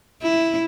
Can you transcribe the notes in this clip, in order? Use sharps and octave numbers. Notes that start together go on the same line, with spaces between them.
E4